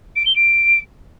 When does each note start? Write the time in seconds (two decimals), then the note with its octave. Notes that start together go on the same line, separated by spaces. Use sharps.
0.16 D7
0.26 G7
0.35 D7